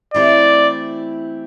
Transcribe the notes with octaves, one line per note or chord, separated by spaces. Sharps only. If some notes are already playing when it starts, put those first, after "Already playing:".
E3 A3 C4 E4 G4 D5